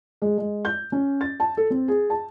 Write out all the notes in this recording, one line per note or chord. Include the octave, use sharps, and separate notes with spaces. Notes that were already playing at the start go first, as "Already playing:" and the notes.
G#3
G#3
G6
C#4
A6
A5
A4
C4
G#4
A5